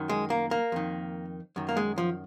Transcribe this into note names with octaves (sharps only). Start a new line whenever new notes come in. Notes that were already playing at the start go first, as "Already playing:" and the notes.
Already playing: F#2 D#3
G#3
A#3
A#3
F2 D#3
F#2 D#3
A#3
G#3
F3